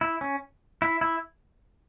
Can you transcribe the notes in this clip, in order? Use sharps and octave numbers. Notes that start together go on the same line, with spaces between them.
E4
C#4
E4
E4